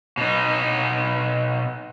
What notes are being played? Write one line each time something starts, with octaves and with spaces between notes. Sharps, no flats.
B2 D#4